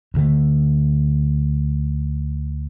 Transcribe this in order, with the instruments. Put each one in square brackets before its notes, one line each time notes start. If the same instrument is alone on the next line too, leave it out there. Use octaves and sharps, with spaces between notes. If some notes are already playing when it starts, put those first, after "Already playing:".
[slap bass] D2 D3 A3